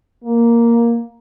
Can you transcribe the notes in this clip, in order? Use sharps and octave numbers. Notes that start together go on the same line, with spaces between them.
A#3